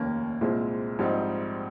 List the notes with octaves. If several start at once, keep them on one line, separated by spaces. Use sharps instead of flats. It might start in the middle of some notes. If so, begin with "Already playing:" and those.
Already playing: F1 D#2 D#3 A#3 C#4
C2 A#2 G#3 C4
A#1 G#2 G3 C4 D#4